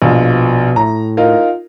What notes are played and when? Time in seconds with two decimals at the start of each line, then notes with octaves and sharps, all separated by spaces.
0.02 A#1 B2 F3
0.76 A2 A#5
1.17 D#4 F4 A#4